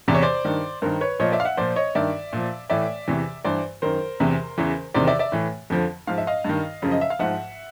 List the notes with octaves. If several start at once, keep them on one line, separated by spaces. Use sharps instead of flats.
E2 C3 E3 D5
C#5
C5 D5
G2 D#3
G2 D#3 A#4 C5
B4 C#5
A#2 F3 C#5 D#5
D5 E5
F5
E5 F#5
A#2 F3 C5 D5
C#5 D#5
G2 D#3 D5 E5
A#2 F3
A2 E3 D5 E5
E2 C3 E3
G2 E3 C5 D5
F#2 D#3 A#4 C5
E2 C3 E3
E2 C#3 E3
E2 C3 D#3 C5 D5
D5 E5
D5 E5
A2 E3
F2 D3 F3
G#2 F3 F5
E5
D#5 F5
G2 D#3
F#2 C#3 F3
D#5
E5
F5
G#2 F3 E5 F#5